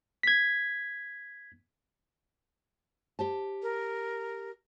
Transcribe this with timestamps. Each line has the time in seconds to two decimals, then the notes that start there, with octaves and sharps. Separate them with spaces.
0.23 G#6 B6
3.19 G4 C5 A5
3.62 A#4